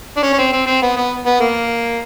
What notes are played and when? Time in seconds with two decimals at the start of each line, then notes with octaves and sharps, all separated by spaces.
0.17 D4
0.23 C#4
0.33 C#4
0.38 C4
0.52 C4
0.67 C4
0.82 B3
0.96 B3
1.26 B3
1.40 A#3